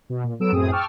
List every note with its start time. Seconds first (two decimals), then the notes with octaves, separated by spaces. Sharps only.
0.10 B2
0.24 A#2
0.40 F#3 B3 A4 E6 D7 E7
0.52 F#2 A2 C4 G#4 D#6
0.72 G5 A5 C#6 D6 E6 F6